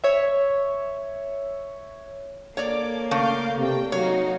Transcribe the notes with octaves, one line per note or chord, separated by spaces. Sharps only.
C#5 E5
A#3 A4 C#5 D5 D6
C#3 A3 F5 D6 G6
C3 D4 G5
F#3 D#4 F#4 C#5 F5